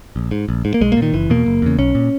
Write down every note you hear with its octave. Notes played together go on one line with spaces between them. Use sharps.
A#1
G#2
A#1
G#2
A#3
B1 G#3
A#3
A#2
D#3
F#1 E3
E2 B2 A#3
F#1
E2 C#3
B1 C#4
A#2